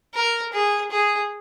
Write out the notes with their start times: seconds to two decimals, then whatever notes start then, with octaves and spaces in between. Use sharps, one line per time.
0.14 A#4
0.53 G#4
0.91 G#4